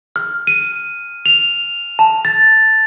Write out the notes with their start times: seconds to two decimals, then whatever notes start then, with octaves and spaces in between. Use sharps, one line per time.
0.16 F6
0.47 D#7
1.26 F7
1.99 A5
2.25 A6